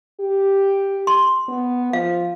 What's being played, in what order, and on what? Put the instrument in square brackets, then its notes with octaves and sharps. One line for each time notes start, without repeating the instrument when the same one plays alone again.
[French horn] G4
[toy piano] C6
[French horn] B3
[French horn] F3 [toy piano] F5